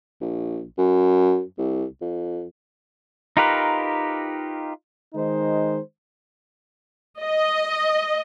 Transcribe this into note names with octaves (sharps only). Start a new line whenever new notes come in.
A#1
F#2
C2
F2
D#4 F4 G4 A#4 B4
D#3 G#3 D#4 C5
D#5